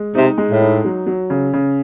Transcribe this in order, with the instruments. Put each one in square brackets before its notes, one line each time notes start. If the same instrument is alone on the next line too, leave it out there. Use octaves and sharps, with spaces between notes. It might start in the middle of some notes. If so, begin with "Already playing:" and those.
Already playing: [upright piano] G#3
[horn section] C3 [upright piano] D#4
[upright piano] G#3
[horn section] A2
[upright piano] D#4
F#3
F#3
C#3
C#3